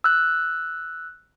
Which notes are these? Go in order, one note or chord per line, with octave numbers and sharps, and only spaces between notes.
E6 F#6